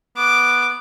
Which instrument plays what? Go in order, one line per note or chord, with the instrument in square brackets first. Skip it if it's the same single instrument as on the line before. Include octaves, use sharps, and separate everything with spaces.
[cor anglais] B3 [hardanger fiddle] D6